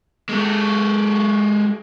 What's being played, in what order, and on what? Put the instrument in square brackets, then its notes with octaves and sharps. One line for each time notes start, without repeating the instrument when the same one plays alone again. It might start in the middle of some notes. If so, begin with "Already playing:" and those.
[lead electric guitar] G#3 A4